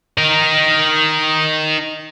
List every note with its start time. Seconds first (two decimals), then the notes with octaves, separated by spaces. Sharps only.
0.18 D#4 A#4